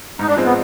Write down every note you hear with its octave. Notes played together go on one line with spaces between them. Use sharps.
G#2 D#4
D4
F3 G#3 C4
B3